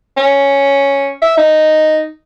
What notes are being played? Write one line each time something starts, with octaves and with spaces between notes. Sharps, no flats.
C#4
E5
D#4